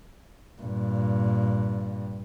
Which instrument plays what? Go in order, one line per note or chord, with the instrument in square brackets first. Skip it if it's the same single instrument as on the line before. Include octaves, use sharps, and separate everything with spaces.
[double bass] G2 A#2